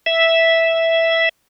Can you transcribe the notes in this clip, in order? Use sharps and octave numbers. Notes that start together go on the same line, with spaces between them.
E5